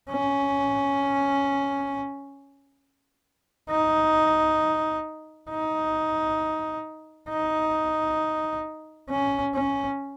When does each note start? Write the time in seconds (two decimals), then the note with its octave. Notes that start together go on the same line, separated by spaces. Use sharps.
0.11 C#4
3.70 D#4
5.50 D#4
7.30 D#4
9.10 C#4
9.55 C#4